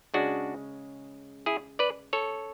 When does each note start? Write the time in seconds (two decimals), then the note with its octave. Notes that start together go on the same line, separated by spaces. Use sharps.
0.14 C#3 G#3 C#4 D4 F#4
1.46 E4 G#4
1.79 B4 D5
2.13 A4 C#5